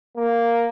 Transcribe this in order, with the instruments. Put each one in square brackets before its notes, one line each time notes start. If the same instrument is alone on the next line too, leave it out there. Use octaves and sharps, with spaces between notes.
[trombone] A#3